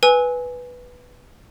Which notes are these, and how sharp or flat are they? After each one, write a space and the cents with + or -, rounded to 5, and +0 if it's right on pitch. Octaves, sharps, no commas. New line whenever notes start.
B4 +0 G#5 +0 E6 -30